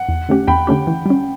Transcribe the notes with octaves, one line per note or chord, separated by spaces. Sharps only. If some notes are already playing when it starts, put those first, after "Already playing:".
Already playing: F#5
E2
D3 A3 C#4 G4
E2 G5 B5
D3 A3 C#4 G4
E3
G3 C#4